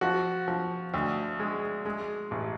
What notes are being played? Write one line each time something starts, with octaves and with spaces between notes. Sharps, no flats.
F3 F#4
F3
D2
G#3
G#3
A1